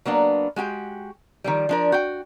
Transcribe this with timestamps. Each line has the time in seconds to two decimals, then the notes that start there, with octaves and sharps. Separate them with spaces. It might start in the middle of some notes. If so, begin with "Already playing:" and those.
0.06 F#3 A#3 B3 D4
0.56 G#3 F#4 G4 G5
1.44 D#3 F3 G3
1.69 F3 D4 A#4
1.92 F#4 G5